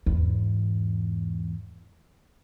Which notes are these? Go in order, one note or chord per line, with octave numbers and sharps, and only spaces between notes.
E2 G#2